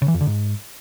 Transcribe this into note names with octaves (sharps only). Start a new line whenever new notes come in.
C#3
E3
F2
D3
G#2